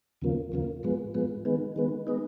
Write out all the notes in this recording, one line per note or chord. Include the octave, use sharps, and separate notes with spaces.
D#2 C#3 F3 A#3
D#2 C#3 F3 A#3
G#2 F3 G#3 B3
G#2 F3 G#3 B3
D#3 G#3 B3
D#3 G#3 B3
G#3 B3 D#4